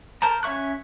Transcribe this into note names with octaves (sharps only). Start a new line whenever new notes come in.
A#4 C5 A5 A#5
C#4 C#5 E5 C#6 F#6